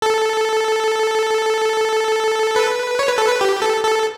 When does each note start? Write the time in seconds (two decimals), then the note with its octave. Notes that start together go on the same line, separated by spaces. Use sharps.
0.02 A4
2.56 B4
2.99 C#5
3.09 B4
3.18 A4
3.28 B4
3.41 G4
3.62 A4
3.84 A4